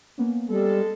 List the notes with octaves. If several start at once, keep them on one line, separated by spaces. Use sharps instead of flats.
A#3 B3 C#4
G3 G#3 A4